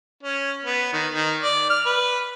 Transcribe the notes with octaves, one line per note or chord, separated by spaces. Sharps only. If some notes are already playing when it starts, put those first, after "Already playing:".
C#4
B3
D#3
D#3
D5
F6
B4